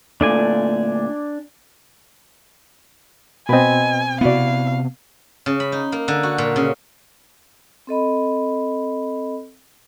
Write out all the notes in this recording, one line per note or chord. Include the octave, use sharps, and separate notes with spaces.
A#2 D3 A3 D4 D5 G#5
B2 C4 B4 D#5 G#5
C3 B3 E4 F#4 D5 F5
C#3
B5
D#4
A#3
D3
F#4
A#2
C#3
C4 A4 D#5 B5